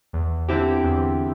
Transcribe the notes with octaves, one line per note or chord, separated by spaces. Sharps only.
E2
D3 C4 E4 G4
E2